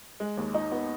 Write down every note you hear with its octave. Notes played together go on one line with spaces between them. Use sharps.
G#3
D#2
D#4
B3